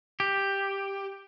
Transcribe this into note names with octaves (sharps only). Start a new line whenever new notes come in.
G4